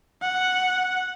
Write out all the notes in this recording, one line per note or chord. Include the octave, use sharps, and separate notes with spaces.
F#5